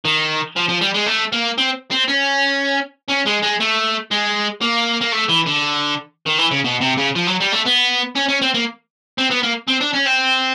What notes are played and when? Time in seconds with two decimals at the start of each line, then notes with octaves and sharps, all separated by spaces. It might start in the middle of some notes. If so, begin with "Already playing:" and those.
0.05 D#3
0.56 F3
0.69 F3
0.81 G3
0.94 G#3
1.06 A3
1.32 A#3
1.58 C4
1.91 C4
2.08 C#4
3.09 C#4
3.27 G#3
3.43 G#3
3.60 A3
4.11 G#3
4.61 A#3
5.01 A#3
5.12 A3
5.28 E3
5.46 D3
6.26 D#3
6.38 E3
6.51 C#3
6.64 B2
6.81 C3
6.97 C#3
7.15 F3
7.27 F#3
7.40 G3
7.53 A3
7.66 B3
8.16 C#4
8.29 C#4
8.42 C4
8.54 A#3
9.18 C4
9.31 B3
9.43 A#3
9.68 C4
9.81 D4
9.94 C#4
10.06 C4